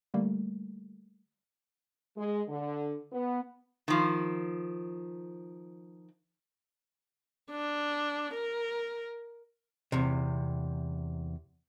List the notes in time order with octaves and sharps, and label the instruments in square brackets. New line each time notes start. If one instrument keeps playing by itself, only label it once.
[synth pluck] D3 G3 A3 A#3
[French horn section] G#3
D3
B3
[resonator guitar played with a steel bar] D#3 F3
[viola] D4
A#4
[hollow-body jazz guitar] E2 C3